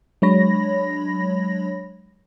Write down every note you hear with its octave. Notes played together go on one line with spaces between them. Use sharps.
F#3 G#3 D4 C#5 B5 A#6